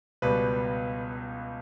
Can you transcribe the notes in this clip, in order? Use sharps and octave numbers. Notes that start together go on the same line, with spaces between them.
C#2 B2 G3 B4